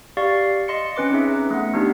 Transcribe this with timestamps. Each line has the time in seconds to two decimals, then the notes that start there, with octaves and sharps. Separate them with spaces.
0.17 G4 D5 F5 C#6 A6
0.68 D#5 C6 C#7
0.96 C4 C#4 B4 D6
1.11 C#4 D#4 G#4 E5
1.51 A3 B3 F#5
1.74 B3 D4 D#4 G4